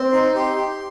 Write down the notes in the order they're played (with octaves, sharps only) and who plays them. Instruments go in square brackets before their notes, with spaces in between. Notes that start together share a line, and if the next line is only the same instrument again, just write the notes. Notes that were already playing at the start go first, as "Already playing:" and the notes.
Already playing: [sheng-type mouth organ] C4
D#4 C6
G4 C6
G4